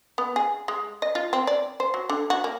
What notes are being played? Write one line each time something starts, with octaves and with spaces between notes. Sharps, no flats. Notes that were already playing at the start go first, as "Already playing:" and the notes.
B3
G#4
G#3
D#5
F4
C4
D5
C5
F#3
D3
F#4
A#3